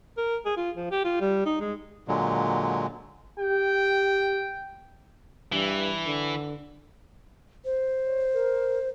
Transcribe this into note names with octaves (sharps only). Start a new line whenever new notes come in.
A#4
G#4
F4
F3
G4
F4
G3
D#4
G#3
A#2 D3 F#3 G#3
G4 G5
G2 E3
D3
C5
C#5
A#4